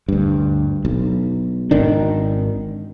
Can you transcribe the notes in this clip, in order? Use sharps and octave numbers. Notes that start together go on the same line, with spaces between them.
D2 G2
B1
G#1 D#3 D4